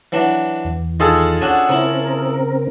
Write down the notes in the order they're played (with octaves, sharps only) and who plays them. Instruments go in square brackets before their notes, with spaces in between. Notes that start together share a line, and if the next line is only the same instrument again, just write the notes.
[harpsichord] E3 F#3 D4
[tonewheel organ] E2
[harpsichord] D#3 [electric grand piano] F4 G#4 A4
[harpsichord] C#4 D4 F#4
[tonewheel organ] C#3 C4 A#4 [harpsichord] E4 C#5